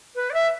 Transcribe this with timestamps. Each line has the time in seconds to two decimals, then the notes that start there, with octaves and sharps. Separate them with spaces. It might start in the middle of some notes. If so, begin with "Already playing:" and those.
0.15 B4
0.30 D5
0.34 E5